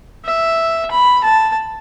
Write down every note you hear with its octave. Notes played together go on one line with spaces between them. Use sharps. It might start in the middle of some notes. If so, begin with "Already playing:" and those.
E5
B5
A5